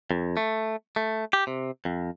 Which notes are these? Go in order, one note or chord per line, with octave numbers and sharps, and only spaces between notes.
F2
A3
A3
G4
C3
F2